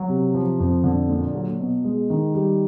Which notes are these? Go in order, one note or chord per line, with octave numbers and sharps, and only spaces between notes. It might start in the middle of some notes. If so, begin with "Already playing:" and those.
Already playing: F#3
C3
F3
F2
D3
A#2
F#3
B2
G#3
D#3
G3